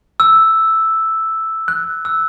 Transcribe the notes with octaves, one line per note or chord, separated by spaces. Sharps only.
E6
F#6
E6